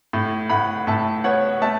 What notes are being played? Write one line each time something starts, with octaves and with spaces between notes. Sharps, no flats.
A2
A2 F#5 B5
A2 E5 A5
B3 C#5 F#5
A3 E5 A5